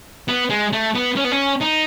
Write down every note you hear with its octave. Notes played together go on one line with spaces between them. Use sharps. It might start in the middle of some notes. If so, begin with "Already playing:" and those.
B3
G#3
A3
B3
C#4
B3
C#4
D#4